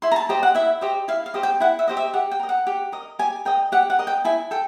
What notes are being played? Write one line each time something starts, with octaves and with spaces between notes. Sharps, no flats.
E4 C6
A#5
A5
G4 C5 D#5
F#5
E4 E5
G4 C5 D#5
E4 F5
F5
G4 C5 D#5
G5
E4 F#5
E5
G4 C5 D#5
E5
G4 F#5
G5
A#4 D#5
F#5
G4
A#4 D#5
G4 G#5
A#4 D#5 G5
G4 F#5
F#5
A#4 D#5
G5
E4 G#5
A4 G5